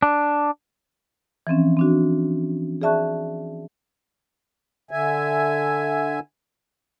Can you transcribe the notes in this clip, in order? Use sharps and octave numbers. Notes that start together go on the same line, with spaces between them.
D4
E3 F3 C4 C#4
C4 D4 F#4
G#4 D5 E5 A5 C#6 F#6
D3 E5 G#5